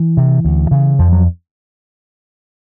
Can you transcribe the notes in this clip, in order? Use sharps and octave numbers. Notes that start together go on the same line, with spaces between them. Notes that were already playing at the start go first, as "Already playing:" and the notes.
Already playing: E3
C3
D2
C#3
F2 F3
F#3